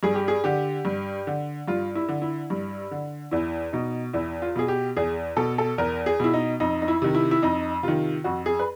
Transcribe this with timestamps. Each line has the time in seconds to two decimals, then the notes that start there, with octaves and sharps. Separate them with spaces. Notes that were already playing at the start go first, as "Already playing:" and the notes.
0.03 G2 G#4
0.15 G4
0.28 G#4
0.44 D3 G4
0.85 G2
1.27 D3
1.68 G2 F4
1.95 E4
2.08 D3
2.22 E4
2.50 G2
2.91 D3
3.31 E2 E4
3.73 B2 D#4
4.13 E2 E4
4.42 F4
4.56 B2 G#4
4.68 G4
4.97 E2 G#4
5.37 B2 A4
5.58 A4
5.78 E2 A#4
6.06 G#4
6.20 B2 E4
6.34 D#4
6.60 F2 D#4
6.82 D#4
6.88 E4
7.02 C3 D#3
7.15 E4
7.31 E4
7.42 F2 D#4
7.83 C3 D#3 F4
8.24 F2 F#4
8.46 G#4
8.59 B4